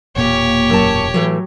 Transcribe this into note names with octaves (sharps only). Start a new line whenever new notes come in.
E1 A#2 A#3 G4 C#5
F#2 A5
A2 E3 F#3 G#3